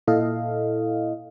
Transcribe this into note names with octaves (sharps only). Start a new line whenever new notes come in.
A#2 E4 A4 D#5 F5